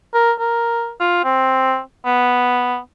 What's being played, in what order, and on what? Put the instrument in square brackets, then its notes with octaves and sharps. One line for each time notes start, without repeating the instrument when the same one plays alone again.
[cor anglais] A#4
A#4
F4
C4
B3